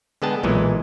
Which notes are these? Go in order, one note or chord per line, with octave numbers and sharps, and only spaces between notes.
D3 G#3 B3 G#4 G5 A5
B1 A#2 E3 G#3